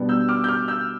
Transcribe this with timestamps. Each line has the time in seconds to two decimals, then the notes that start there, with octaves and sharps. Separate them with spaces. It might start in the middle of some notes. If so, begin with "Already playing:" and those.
Already playing: B2 G3 B3 D4
0.09 E6 G6
0.28 D6 F6
0.44 G6
0.48 D6 F6
0.68 E6 G6